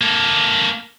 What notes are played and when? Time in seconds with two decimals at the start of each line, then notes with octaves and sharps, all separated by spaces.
0.01 A#3 A4